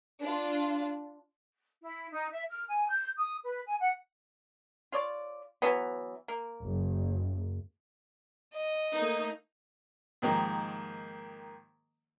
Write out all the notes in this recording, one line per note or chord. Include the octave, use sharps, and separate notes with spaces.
D4 F4
E4
D#4
E5
F6
G#5
G6
D#6
B4
G#5
F#5
F4 C#5 D5
E3 F#3 B3
A#3
F#1
D#5
A3 A#3 D#4
G#2 D#3 F3 A#3 G4